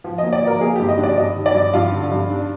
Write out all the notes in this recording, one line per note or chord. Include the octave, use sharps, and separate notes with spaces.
F3
D#5
A#3
D5
F3 A#4
A#3 G#4
G4
G2
D#5
D4
D5
G2 D#5
D#3
D5
G2
G2 F4
D3
G2
D4